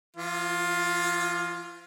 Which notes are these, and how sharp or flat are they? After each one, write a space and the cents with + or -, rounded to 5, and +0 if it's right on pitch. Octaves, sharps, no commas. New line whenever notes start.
F3 -45 F4 +15